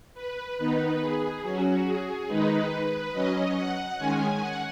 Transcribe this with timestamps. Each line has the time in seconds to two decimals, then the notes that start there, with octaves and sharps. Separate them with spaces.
0.14 B4
0.57 D#3 B3 D#4 B4
1.00 G#4
1.43 F#3 C#4 F#4
1.85 G#4
2.28 D#3 G#3 D#4 B4
3.13 F#3 C#4 D#5
3.56 F#5
3.98 D#3 G#3 C#4 G#5
4.41 F#5